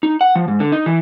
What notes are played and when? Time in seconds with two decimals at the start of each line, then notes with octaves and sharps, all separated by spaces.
0.03 D#4
0.21 F#5
0.35 F3
0.48 G#2
0.60 D3
0.72 D#4
0.86 E3